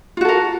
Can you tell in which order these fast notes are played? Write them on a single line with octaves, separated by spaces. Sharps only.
F4 F#4 A4 A#4